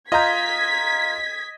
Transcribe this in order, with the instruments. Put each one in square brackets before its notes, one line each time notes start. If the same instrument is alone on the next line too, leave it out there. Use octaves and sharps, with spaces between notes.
[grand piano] F4 A#5 [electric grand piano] D#5 G6 [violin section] G#6 B6